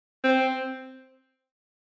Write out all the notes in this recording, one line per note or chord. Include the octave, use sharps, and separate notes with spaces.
C4